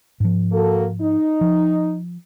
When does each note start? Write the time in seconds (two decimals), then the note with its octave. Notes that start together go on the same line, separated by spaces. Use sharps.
0.20 G#2 F3
0.52 A#3 F#4 A4
1.01 D#4
1.41 F3